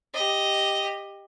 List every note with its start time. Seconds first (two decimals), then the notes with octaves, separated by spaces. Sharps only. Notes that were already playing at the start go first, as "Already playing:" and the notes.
0.14 G4 D#5